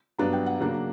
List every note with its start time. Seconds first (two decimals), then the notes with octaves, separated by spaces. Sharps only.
0.19 G2 F#3 B3 D4 A#5
0.33 G5
0.46 F#5
0.60 C#3 F#3 A#3 D4